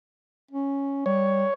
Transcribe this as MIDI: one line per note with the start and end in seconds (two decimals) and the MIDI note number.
0.51 1.02 61
1.06 1.45 55
1.06 1.54 73